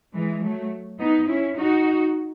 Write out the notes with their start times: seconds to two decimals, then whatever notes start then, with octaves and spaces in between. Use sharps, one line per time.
0.14 E3 G#3
0.43 F#3 A3
1.00 B3 D#4
1.28 C#4 E4
1.57 D#4 F#4